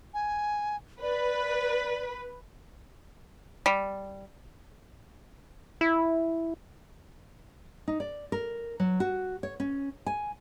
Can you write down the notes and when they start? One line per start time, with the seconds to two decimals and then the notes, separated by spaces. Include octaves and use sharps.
0.14 G#5
1.02 B4 D5
3.66 G3
5.81 E4
7.88 D#4
8.00 D5
8.32 A#4
8.80 F#3
9.00 F#4
9.43 C#5
9.60 C#4
10.06 G#5